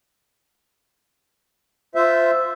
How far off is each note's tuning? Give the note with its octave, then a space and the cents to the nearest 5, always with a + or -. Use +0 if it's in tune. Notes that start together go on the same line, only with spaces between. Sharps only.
F4 +0 C5 -15 E5 +0